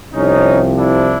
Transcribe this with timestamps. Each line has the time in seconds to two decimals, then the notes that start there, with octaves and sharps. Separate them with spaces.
0.14 C2 C3 F3 C#4 D#4
0.77 D4 E4